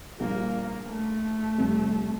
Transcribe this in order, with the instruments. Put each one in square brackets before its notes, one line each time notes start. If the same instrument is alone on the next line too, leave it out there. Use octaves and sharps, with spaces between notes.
[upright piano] A#1 A#2 G3 [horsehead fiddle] A#3
[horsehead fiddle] A3
[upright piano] F1 F2 C3 G3